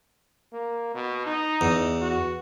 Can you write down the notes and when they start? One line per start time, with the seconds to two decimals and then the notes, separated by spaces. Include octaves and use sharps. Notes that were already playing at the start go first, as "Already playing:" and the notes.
0.53 A#3
0.95 B2
1.26 D#4
1.61 E2
2.01 F#4